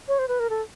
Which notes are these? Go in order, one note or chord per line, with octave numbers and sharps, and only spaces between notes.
C#5
C5
B4
A#4
A4